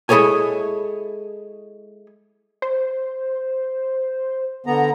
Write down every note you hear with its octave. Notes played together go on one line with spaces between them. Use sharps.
G#3 E4 G#4 A4 C#5 G#5
C5
D3 B3 A#5